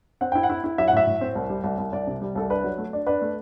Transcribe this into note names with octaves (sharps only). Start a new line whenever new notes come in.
C4 F#5
E4 G5
F#5
E4
E4
F#3 E5
F#5
A2 E5
A2
C4
C2
G3
C2
C2
C2 D5
C3
G3
C2 A4
D4 B4
F#3
A3
D4
D4 B4
A3